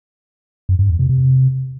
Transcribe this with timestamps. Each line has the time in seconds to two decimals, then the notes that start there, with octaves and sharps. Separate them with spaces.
0.69 F#2
0.79 G2
0.89 E2
0.99 C3
1.09 C3